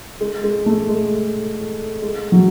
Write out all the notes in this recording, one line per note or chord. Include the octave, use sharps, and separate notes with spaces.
G#3
G#3
A3
G#3
G#3
F#3